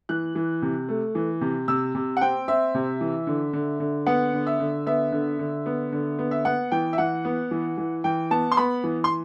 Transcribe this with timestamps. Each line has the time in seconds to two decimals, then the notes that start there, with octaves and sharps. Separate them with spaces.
0.09 E3 F#6
0.35 E3
0.62 C3
0.89 A3
1.15 E3
1.41 C3
1.68 C3 E6
1.95 C3
2.17 F#5
2.21 C4 G5
2.48 C4 E5
2.75 C3
3.01 E3
3.27 D3
3.53 D3
3.80 D3
4.06 B3 F#5
4.33 D3
4.47 E5
4.60 D3
4.86 B3 E5
5.12 D3
5.39 D3
5.66 B3
5.92 D3
6.19 B3
6.31 E5
6.45 B3 F#5
6.71 E3 G5
6.93 E5
6.98 E3 F#5
7.25 B3
7.51 E3
7.78 E3
8.04 E3 G5
8.31 B3 A5
8.52 C6
8.57 B3 B5
8.84 E3
9.04 C6